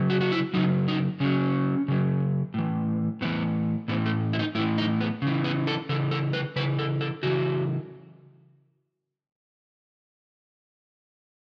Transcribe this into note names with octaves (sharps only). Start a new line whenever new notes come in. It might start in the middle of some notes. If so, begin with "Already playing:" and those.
Already playing: C#3 F#3
F#4
F#4
E4
C#3 F#3 D#4
D#4
C#3 F#3 C#4
C#3 F#3
A2 E3
A2 E3 B3
A2 E3 B3
A3
E4
D#4
A2 E3 E4
D#4
B3
C#3 E3
B3
A4
C#3 E3 A4
A4
B4
C#3 E3 B4
A4
A4
C#3 E3 F#4